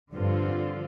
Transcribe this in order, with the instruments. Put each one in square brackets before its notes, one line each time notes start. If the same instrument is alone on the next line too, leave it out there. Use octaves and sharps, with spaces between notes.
[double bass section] G2 [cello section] D3 F3 C4 F4